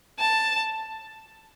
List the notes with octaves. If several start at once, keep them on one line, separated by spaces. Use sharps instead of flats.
A5